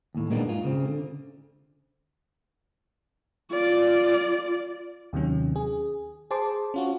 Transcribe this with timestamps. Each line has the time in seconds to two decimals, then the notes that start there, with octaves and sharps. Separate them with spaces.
0.15 D#2 A2
0.30 A#2 G#3 A#3 B3 D4 D#4
0.46 G#2 F4
0.65 C#3 C4
0.85 D3
3.51 F4 D5
5.13 D#2 C3 D#3 F#3 C#4
5.56 G#4
6.31 G#4 C5 A5 C6 D6
6.74 C#4 F4 F#4